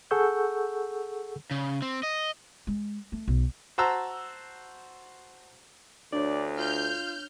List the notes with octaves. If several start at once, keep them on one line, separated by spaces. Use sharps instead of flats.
G#4 A4 F#5 C#6 E6 G6
C#3
C4
D#5
G#3
A3
B1
F#4 C5 A5 A#5 E6
D2 D4 C#5 D5
F4 F6 G6